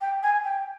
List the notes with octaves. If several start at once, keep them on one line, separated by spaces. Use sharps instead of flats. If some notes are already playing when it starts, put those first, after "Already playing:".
G5
G#5
G5